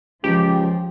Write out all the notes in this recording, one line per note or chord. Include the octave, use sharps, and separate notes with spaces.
C#2 F3 G4